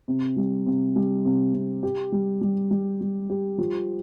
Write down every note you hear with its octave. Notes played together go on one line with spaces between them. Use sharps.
C3
G3
C3
G3
C3
C3
G4
G3
G3
G3
G3
G4
F3